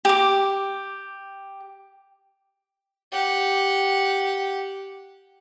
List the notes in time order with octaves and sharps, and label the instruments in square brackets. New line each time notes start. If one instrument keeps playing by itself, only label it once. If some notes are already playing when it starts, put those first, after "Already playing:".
[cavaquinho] G4 D6
[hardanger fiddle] G4 F#5